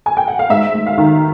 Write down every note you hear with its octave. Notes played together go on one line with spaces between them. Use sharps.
G#5
G5
F#5
F5
G#2 E5
A3
F5
D#3